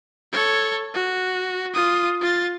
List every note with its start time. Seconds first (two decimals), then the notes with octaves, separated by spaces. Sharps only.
0.33 A4 C#5
0.94 F#4
1.74 F4 D#6
2.21 F4 A6